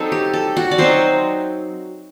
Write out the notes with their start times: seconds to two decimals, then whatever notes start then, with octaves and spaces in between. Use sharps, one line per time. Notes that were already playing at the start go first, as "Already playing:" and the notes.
Already playing: F#3 C4 D#4 A4
0.12 G4
0.34 A4
0.57 F#4
0.71 D5
0.78 F#3 C4 D#4 C5